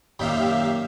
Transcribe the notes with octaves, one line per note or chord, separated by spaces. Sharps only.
F#2 A#2 D#3 G4 E5 F5